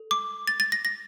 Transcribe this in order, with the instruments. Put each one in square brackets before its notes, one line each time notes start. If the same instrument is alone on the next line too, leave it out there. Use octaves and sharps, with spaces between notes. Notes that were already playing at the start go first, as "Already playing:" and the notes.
Already playing: [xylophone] A4
D6
A6
A6
A#6
A#6